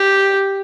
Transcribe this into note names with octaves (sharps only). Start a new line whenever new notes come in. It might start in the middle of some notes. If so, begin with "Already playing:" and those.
Already playing: G4